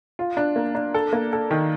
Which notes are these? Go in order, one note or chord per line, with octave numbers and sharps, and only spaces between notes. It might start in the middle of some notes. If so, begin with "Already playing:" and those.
F4
D4
A#3
D4
A4
A#3
A4
D#3